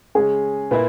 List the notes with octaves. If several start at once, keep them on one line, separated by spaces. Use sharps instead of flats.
C#3 G#3 C#4 G#4
A#2 A#3 E4 B4